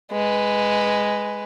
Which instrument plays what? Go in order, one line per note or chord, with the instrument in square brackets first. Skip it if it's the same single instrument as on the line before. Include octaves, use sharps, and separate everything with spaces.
[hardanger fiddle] G#3 B4